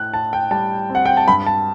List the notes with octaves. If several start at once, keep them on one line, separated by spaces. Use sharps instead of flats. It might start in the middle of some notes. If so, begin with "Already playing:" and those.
Already playing: A2 F#6
A2 A5
G5
G3 A5
C4
F#5
G5
A5
G2 B5
A5